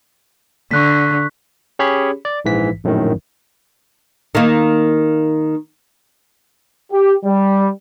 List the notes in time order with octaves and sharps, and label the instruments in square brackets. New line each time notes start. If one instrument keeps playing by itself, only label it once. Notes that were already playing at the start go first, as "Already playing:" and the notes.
[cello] D3 [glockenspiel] C#6 F#6 B6
[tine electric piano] C#4 G4 G#4 C#5 B5
D5
A#1 G#2 E3 B6
A#1 F#2 A2 D#3
[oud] D#3 A#3
[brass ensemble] G4
G3